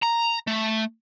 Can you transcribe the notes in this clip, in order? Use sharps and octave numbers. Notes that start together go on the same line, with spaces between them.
A#5
A3